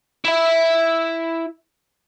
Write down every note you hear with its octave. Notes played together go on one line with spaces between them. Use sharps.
E4 E5